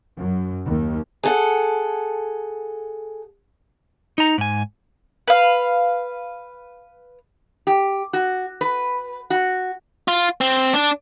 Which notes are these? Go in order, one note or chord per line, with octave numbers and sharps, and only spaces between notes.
F#2
D#2
G#4 A4 F#5
D#4 A#5
G#2 G#5
B4 F5
G4
F#4
B4
F#4
F4
C4
D4